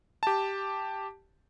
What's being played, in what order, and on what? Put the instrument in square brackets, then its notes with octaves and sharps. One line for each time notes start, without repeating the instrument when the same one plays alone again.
[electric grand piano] G4 A5